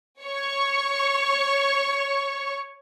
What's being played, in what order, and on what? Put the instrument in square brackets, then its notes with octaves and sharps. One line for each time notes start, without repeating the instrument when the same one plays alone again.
[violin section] C#5 C#6